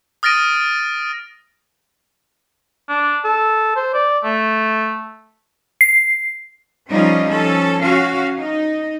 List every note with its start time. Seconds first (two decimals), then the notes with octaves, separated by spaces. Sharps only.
0.23 D#6 F6 A6 A#6 D7 D#7
2.89 D4
3.25 A4
3.76 C5
3.94 D5
4.24 A3
5.81 C7
6.90 F3 G3 C#4 D#4 F4
7.27 F3 C#4 A4
7.83 C#4 F#4 F5
8.38 D#4